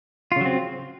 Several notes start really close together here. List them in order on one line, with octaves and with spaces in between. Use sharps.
F4 C#3 F#3 C4